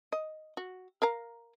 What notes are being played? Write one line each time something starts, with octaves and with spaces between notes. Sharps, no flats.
D#5
F#4
A#4 F5 A#5